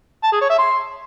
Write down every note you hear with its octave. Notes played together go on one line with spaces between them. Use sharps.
A5
G#4
C#5
E5
C6